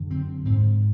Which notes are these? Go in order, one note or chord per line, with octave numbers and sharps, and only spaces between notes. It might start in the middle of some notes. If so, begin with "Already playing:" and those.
Already playing: F#2 D3
C4
G#2 C4